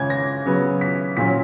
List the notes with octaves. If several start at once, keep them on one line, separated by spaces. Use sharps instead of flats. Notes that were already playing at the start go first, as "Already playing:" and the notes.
Already playing: C#3 G#3 C#4 G#6
A#6
C#3 F#3 B3
B6
A#2 F#3 C#4 B6